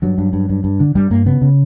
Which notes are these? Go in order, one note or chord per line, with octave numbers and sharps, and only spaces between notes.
G2 F#3
G2
G2
G2
G2
D3
G2 G3
G2 A#3
C#3 B3
C#3